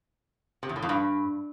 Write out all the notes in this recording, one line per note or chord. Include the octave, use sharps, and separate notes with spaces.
C3
E2
A2
F2
G2